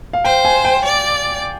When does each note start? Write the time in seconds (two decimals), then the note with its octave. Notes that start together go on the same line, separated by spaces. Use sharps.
0.13 F5
0.25 C5 G5
0.45 G#5
0.65 G5
0.85 D5